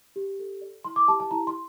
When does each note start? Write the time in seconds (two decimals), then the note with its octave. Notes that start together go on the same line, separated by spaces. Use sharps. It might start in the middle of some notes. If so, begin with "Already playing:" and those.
0.16 G4
0.39 A4
0.61 D5
0.85 E4 C6
0.96 D6
1.08 G4 A5
1.20 A5
1.31 E4 A#5
1.47 C6